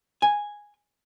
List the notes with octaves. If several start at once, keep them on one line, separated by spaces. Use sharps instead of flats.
G#5